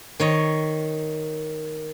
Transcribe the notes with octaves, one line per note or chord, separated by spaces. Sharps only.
D#3 C#5 D#5